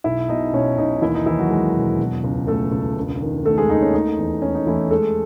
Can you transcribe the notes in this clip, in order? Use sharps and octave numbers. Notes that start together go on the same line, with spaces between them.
B1 E4 E5
B2 D#4 D#5
B2 C#4 C#5
B1 D#4 D#5
D#2 E3 E4
D#4
D#3 E3 E4
F#3 F#4
G#3
E1
B2
C#2
C#2 A3 A4
C#2
E1
D#3
D#3 A3 A4
G#3 G#4
D#2 D#4
C#4
A3 D#4
E2
A3 C#4
D#4
E3 A3 E4
G#3 A3 A4